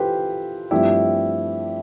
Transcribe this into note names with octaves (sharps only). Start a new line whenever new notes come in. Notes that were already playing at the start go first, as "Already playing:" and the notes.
Already playing: E3 F4 G4 A4 B4 C5
G2 F3 A3 C4 E4 G4